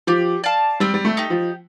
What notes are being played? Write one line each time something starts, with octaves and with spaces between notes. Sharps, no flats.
F3 G4
D5 F5 A5
G3 C4
G3
A3
D#4 G4
F3